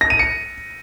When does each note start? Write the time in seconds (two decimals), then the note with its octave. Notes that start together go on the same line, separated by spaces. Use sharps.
0.01 A#6
0.10 D#7
0.19 C#7